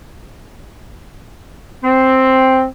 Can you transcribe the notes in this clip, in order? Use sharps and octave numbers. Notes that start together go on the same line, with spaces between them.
C4